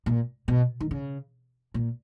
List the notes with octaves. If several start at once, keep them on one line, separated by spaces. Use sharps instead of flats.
A#2
B2
D#3
C#3
A#2